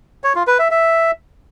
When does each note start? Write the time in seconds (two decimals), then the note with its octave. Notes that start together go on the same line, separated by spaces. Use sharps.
0.24 C#5
0.36 F4
0.47 B4
0.59 E5
0.71 E5